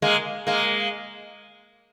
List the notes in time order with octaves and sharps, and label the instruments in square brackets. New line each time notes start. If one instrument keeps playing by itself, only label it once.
[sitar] G#3 A#3
G#3 A#3